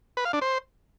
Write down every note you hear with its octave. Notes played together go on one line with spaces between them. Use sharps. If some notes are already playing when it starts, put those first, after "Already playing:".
B4
F5
D4
C5